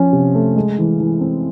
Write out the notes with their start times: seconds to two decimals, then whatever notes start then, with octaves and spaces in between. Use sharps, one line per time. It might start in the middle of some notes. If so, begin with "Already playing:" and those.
Already playing: F3 C#4
0.13 C3
0.34 A3
0.56 G#3
0.78 E3
1.00 E3
1.21 C4